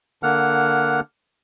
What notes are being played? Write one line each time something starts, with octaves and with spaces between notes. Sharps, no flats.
D3 A#3 F#5 F6